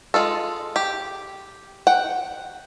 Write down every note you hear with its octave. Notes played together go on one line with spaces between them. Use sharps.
G#3 F4 A4
G4
F#5 G5